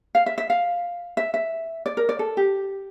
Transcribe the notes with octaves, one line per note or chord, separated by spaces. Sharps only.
F5
E5
E5
F5
E5
E5
D5
A#4
D5
A4
G4